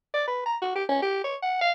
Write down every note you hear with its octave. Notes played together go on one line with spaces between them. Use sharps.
D5
B4
A#5
F#4
G4
C#4
G4
C#5
F#5
F5